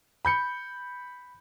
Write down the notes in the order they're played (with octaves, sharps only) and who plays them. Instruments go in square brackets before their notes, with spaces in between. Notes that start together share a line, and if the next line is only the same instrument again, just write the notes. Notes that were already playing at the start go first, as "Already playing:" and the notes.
[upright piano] B5 G6 C#7